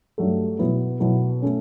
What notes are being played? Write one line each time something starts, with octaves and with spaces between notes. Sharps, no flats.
G2 F#3 A3
B2 F#3 B3 E4
B2 F#3 B3 E4
A3 C#4